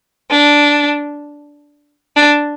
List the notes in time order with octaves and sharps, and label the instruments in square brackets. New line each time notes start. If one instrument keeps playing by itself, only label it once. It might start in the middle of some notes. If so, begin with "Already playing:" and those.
[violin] D4
D4